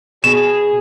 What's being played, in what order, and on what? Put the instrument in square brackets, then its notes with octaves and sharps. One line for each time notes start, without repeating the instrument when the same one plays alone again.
[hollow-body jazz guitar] B2 [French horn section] G#4 [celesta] E7